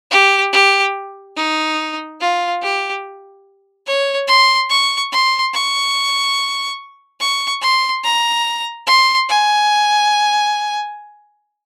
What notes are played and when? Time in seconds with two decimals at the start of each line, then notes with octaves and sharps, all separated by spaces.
0.11 G4
0.52 G4
1.37 D#4
2.20 F4
2.62 G4
3.87 C#5
4.28 C6
4.70 C#6
5.12 C6
5.53 C#6
7.20 C#6
7.61 C6
8.04 A#5
8.87 C6
9.29 G#5